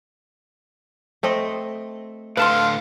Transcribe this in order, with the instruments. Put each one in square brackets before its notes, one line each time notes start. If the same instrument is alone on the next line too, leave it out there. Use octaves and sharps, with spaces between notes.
[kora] A3 C4 D#5
[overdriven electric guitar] A2 D3 [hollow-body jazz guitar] B4 A5 C6 [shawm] F5